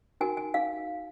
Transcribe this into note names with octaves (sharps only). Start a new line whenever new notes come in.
D#4 F#4 A#4 G#5
G#5
D#4 F5